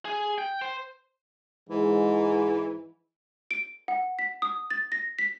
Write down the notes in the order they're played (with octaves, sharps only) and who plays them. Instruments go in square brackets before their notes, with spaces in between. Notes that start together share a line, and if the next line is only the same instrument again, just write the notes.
[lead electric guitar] G#4
G5
C5
[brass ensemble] G#2 [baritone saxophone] E3
[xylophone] D7
F#5
B6
D#6
A6
A#6
B6